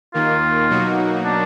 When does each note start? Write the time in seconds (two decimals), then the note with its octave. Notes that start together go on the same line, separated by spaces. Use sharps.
0.14 D#2 D#3 A#3 F4
0.69 B2 F#3 A#3 D#4 F#4
1.25 D4